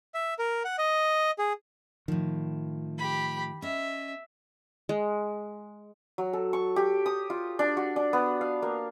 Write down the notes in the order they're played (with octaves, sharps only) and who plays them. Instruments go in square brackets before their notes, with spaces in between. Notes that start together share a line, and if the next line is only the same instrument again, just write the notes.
[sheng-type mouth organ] E5
A#4
F#5
D#5
G#4
[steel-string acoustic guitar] A2 F3 [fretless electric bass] D#3
[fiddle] G4 B5
[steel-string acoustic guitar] C#4 D#5 [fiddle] E5
[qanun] G#3
[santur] F#3
A4
C#6
G4
D#6
F4
D4
F#4
D4
B3
F5
A#3